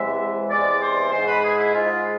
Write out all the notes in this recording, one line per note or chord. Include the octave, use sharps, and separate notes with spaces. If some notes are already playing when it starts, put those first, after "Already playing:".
Already playing: E2 C3 E3 G#3 E5
E2 C3 E3 G#3 D5
C5
G#2 G#3 C5
B4
G#4
E4
G#2 G#3 F4